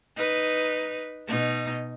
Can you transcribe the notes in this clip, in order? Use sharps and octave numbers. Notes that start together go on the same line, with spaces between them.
D#4 B4
B2 D#4